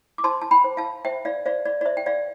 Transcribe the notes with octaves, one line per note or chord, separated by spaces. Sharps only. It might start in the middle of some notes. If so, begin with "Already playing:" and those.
D6
C5 A5 C6
A5
G5 B5
C5
F5 A5
C5 E5 G5
D5 F5
C5 D5 F5
D5
D5
C5 E5
G5
D5 F5